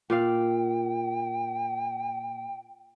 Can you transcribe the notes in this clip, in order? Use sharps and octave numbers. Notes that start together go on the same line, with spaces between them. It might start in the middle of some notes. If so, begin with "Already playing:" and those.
A#2 D5 F5 G5